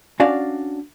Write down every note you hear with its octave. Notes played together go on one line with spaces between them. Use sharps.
C#4 D4 F#4 D5 F5